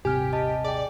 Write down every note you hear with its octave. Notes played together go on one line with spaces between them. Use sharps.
D#1 G#1 C3 G4 G#5 F6
D#5 A5
G#4 D5 G5